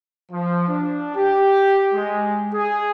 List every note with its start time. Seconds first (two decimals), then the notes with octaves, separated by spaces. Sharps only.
0.32 F3
0.68 D4
1.15 G4
1.93 G#3
2.53 G#4